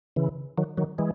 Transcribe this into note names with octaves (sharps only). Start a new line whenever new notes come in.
C#3 E3
D#3 F#3
D#3 F#3
E3 G#3